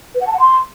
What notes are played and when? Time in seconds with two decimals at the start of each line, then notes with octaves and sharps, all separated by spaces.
0.15 B4
0.21 F#5
0.27 A5
0.33 F#5
0.40 C6